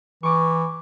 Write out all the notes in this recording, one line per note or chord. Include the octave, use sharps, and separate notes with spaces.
E3 C#6 D6